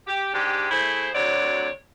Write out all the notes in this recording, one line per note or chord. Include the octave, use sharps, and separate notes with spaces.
G4
G#2 G#3 D4 G4
A3 E4 G#4 C5
D2 C3 F#3 C4 C#5 D5